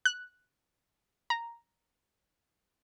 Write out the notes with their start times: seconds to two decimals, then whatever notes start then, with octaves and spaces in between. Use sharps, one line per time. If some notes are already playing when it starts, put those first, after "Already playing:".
0.05 F#6
1.30 A#5